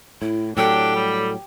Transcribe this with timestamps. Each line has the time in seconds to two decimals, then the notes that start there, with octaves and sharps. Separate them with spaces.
0.22 A2 E4
0.57 A2 F#3 D4 G4 A4 G5
0.95 G3